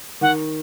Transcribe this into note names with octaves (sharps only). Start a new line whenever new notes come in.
D#3 F#5